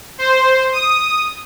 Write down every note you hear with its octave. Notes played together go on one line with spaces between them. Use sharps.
C5
D#6